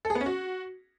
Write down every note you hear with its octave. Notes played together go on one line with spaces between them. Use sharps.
A4
G#4
B3
C#4
F#4